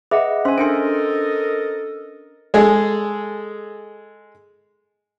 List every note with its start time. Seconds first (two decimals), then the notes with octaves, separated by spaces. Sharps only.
0.11 G#4 B4 D#5 E5 F#5
0.45 C#4 C5 E5 G#5 C6
0.58 D4 A4 A#4 C5 D#5 G5 C6 D7
2.54 G#3 G#4 A4